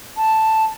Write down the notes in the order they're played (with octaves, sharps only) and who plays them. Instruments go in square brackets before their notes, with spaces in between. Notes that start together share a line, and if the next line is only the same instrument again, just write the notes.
[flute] A5